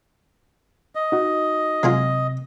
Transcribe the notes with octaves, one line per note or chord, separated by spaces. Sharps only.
D#5
D#4 F#4
C3 F#3 G#3 F4